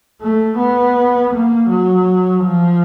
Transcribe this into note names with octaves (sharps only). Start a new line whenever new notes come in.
A3
B3
A#3
F#3
F3